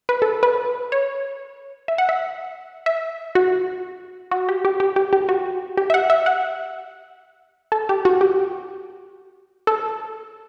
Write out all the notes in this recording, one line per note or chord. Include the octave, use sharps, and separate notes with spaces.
B4
A4
B4
C#5
E5
F#5
E5
E5
F#4
F#4
G4
G4
G4
G4
G4
F#4
G4
E5
F#5
E5
F#5
A4
G4
F#4
G4
A4